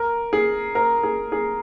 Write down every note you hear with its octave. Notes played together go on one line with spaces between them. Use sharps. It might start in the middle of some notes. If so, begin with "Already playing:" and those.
Already playing: A#4
G#4
A#4
G#4
G#4